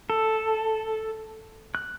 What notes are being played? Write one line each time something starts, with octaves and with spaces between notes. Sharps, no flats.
A4
F#6